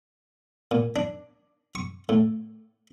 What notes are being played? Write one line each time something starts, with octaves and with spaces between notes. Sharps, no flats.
A#2
D4
C#6
A2